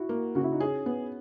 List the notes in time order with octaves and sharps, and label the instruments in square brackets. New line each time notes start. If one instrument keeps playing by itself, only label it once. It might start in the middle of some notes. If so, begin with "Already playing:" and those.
Already playing: [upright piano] E4 F#4
[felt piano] A#3
[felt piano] C#3 [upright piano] F#4
[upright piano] E4
D#4
[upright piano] C#4 [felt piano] G#4
[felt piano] B3